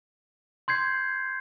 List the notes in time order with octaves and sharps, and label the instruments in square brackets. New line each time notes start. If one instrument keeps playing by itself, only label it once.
[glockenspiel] C6 G6 G#6 C7